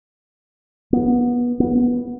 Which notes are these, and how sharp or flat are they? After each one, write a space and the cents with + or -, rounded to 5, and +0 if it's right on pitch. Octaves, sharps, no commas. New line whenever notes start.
B3 -25
B3 -15